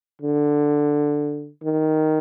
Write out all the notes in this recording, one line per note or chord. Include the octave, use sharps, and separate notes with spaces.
D3
D#3